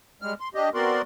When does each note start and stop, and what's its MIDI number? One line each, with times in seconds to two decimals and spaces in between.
0.22 0.34 55
0.22 0.34 56
0.22 0.34 89
0.40 0.49 84
0.54 0.69 62
0.54 0.69 67
0.54 0.69 75
0.74 1.02 59
0.74 1.02 60
0.74 1.02 66
0.74 1.02 70
0.74 1.02 74
0.74 1.02 84